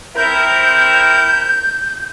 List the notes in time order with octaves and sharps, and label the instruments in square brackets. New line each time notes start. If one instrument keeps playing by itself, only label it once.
[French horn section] C4 E4 A#4 [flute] G6